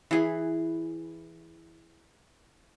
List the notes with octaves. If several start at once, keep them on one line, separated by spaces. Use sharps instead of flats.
E3 G#4